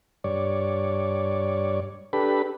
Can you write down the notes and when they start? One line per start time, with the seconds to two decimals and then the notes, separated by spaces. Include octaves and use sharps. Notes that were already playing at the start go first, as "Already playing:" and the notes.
0.24 G2 C#5 D5
2.13 D4 G4 A4 B4 B5